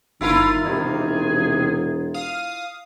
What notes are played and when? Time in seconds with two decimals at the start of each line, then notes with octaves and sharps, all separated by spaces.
0.21 G1 D#3 E4 F4 A#4
0.65 E1 C3 D#3 G#4
2.14 F5 D#6